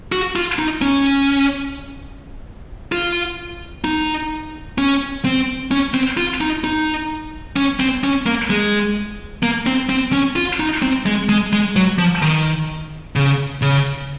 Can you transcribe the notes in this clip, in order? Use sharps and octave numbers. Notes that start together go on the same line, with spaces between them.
F#4
F4
D#4
C#4
F4
D#4
C#4
C4
C#4
C4
F4
D#4
D#4
C#4
C4
C#4
A#3
G#3
A#3
C4
C4
C#4
F4
D#4
C4
G#3
G#3
G#3
F#3
F3
D#3
C#3
C#3